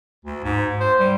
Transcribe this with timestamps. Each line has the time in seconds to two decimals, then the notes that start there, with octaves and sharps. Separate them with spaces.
0.25 D2
0.44 G#2
0.80 C5
1.00 G3